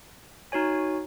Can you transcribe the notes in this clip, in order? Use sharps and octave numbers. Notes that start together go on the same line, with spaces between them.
D#4 F#4 C#5 G#5